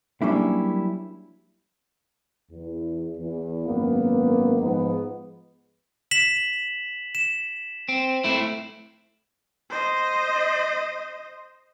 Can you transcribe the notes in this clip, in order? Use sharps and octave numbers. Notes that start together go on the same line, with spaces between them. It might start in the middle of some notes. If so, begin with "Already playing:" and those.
F#3 G3 A#3 C#4 D4 E4
E2
E2
G#1 F#2 A#3 B3
G#2 F3 G#3 B3 D#4
B6 E7 F#7
E7
C4
A3 C4 E4
C5 D#5